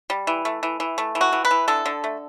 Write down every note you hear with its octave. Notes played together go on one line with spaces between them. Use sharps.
G3
E3
A3
E3
E3
A3
E3
F#4
E3
B4
E3
D3 A4
D3
A3